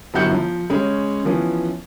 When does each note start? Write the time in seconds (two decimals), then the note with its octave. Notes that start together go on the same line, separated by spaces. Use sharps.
0.14 G1 F#2 E4 F#4 G6 C#7
0.31 F3
0.70 C#3 G#3 C#4 C#5
1.25 E3 F3 B3 C#4